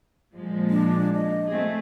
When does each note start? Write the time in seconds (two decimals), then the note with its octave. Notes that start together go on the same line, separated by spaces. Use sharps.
0.34 A#2 F3 G#3
0.70 D4
1.13 D#5
1.48 A3 C4 G#4